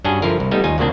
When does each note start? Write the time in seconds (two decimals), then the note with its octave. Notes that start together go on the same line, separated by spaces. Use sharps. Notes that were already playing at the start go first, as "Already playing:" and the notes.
0.05 G2 C#4 D4 F#4 G#4
0.22 G2 D3 F3 E4 F4 A#4
0.40 C2
0.51 G3 A3 B3 D#4
0.64 D#2 D#4 F4 G#5
0.78 D2 A#2 C#3 A#3 C4 D4